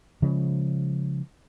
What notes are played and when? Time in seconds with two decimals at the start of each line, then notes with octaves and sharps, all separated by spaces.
0.22 C#3 F3 G#3